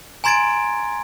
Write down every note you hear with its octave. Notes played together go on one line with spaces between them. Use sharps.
G#5 A#5 C6 G#6 A6 D7